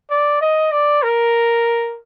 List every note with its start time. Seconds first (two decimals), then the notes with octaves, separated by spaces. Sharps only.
0.10 D5
0.41 D#5
0.72 D5
1.03 A#4